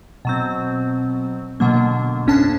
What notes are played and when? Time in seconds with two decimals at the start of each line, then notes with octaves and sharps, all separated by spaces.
0.25 B2 F#3 C4
1.60 B2 D3 F#3 A#3
2.26 G1 F2 C#4 D4 A5